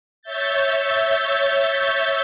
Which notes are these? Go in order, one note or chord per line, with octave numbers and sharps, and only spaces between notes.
C#5 E5 G6 A6